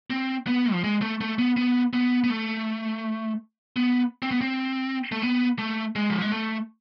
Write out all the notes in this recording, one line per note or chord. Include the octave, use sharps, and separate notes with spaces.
C4
B3
F3
G#3
A3
A3
B3
B3
B3
B3
A3
B3
C4
B3
C4
A3
B3
A3
G#3
F3
G#3
A3